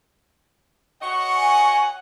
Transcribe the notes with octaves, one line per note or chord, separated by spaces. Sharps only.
F#4 C#5 D#5 F#5 C#6
G#5